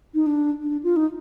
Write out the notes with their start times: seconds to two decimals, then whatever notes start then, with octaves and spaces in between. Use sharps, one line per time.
0.14 D#4
0.27 D4
0.61 D4
0.83 F4
0.96 D#4